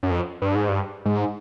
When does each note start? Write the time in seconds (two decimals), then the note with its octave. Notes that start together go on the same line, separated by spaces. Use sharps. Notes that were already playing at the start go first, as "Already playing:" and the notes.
0.03 F#2
0.11 F2
0.42 G2
0.55 G#2
0.69 G2
1.05 G#2